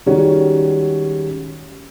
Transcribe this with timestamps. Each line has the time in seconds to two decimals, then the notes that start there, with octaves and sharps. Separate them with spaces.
0.06 D#3 G3 G#3 C#4 F#4